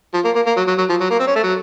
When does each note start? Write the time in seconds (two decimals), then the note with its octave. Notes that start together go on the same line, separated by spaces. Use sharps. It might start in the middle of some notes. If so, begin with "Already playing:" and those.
0.14 F3
0.25 A#3
0.35 A#3
0.47 A#3
0.57 F#3
0.67 F#3
0.78 F#3
0.89 F3
1.01 F#3
1.10 A#3
1.19 C4
1.27 C#4
1.36 A3
1.43 F#3